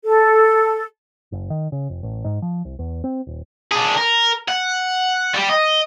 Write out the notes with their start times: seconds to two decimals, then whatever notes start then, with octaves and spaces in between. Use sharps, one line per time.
0.05 A4
1.32 F#1
1.50 D#3
1.72 C#3
1.90 F1
2.03 A1
2.24 G#2
2.42 F3
2.65 C2
2.79 E2
3.04 C4
3.27 D#1
3.72 D4 G#4
3.97 A#4
4.48 F#5
5.34 G3 G4
5.50 D#5